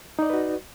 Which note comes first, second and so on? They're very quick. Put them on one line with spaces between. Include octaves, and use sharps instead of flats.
D#4 D5 D#5 B4 F#4